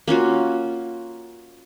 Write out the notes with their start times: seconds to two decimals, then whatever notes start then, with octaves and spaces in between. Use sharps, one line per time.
0.07 A#3 C#4 F4 F#4